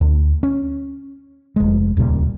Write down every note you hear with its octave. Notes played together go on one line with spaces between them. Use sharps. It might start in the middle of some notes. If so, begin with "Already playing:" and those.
D2
C#4
F1 G#3
D#1 C#2 A#2 G3